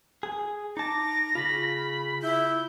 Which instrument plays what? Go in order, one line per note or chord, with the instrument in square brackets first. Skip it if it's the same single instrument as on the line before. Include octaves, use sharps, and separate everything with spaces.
[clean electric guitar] G#4
[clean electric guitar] D#4 A5 [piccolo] D6 [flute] A#6
[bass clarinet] C#3 [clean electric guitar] F4 [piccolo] B5
[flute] E4 [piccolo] G6